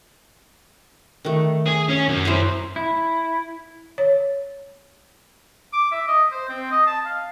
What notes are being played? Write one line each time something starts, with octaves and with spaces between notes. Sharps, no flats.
D#3 A3
G#4
C#4
F#2
E4 C5
E4
C#5
D6
E5
D#5
C5
C4
D#5
A5
F5